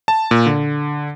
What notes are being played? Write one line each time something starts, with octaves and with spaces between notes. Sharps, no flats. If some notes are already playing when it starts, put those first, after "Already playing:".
A5
A#2
D3